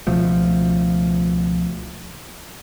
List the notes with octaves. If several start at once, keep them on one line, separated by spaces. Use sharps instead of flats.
C#2 B2 F3 A3